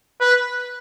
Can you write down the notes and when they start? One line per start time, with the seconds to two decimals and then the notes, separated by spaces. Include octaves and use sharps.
0.21 B4